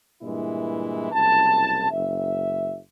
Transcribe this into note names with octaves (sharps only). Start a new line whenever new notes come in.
G2 A#2 E3 G#3 E4
F#1 C2 A5
F#1 E5